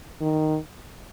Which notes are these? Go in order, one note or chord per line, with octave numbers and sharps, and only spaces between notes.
D#3